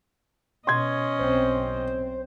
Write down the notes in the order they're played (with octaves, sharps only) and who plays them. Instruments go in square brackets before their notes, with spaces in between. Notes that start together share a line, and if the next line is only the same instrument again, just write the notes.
[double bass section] B2 [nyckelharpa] C#4 D#5 [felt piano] C6 G#6
[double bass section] B1 C4 [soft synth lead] C5